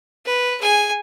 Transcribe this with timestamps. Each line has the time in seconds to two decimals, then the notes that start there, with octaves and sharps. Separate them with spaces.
0.25 B4
0.61 G#4 G#5